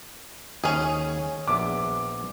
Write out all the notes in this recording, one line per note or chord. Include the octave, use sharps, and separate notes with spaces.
D#2 C#4 G#4
A#1 B3 E5 D6